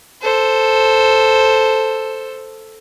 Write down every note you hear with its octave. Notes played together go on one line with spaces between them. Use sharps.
A4 C5